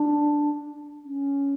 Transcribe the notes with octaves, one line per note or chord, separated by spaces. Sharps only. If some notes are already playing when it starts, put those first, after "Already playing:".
Already playing: D4
C#4